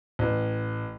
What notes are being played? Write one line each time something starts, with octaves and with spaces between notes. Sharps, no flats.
A1